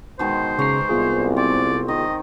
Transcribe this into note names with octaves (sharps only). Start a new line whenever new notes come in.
B2 D#3 G#3 C5
C#3 A#5 C#6 D6 C7
C2 B3 F4 G#4
C4 D5
D#3 D#5